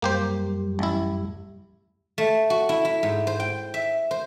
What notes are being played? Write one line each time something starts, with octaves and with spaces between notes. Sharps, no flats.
F#2 G3 A#3 G4 C5
A1 E4
A3
F#4
E4
E4
G#2
C5
G5
E5
C5